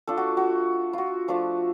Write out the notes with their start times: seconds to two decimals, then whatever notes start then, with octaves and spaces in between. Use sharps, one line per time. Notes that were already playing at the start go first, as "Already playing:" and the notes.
0.07 A3 D4 F4 A4
0.17 F#4
0.37 F#4
0.93 F4 F#4
1.28 F3 A3 D4 F4